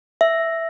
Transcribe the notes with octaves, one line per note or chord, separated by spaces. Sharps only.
E5